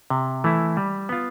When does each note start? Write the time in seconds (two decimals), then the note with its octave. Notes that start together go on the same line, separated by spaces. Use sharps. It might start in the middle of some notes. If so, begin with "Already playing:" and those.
0.10 C3
0.44 E3 A3 E4
0.77 G3
1.09 B3 F4